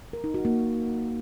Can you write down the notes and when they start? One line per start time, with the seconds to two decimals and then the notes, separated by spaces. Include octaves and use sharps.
0.13 A#4
0.24 D#4
0.34 F#4
0.45 A#3